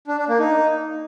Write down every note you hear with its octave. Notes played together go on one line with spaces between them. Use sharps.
D4
D4
A#3
D#4